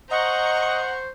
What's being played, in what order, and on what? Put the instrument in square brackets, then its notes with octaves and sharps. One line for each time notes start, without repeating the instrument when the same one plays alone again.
[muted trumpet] C5 [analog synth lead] D#5 [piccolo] F#5 [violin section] A#5 C#6 G6